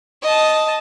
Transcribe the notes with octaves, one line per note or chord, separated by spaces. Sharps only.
D#5 A5